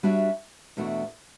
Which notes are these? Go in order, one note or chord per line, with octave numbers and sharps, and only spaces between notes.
G3 D4 F#4 C#5 E5
E2 B2 A3 D4 F#4